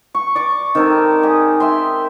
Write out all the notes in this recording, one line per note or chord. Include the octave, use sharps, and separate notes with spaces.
C#6
D5 C#6 D6
D#3 C4 A4 A#4
G4 G#4 D#5
E5 G5 C6